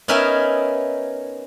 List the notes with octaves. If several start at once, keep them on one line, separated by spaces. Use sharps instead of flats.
B3 C#4 D#4 A#4 E5 G#5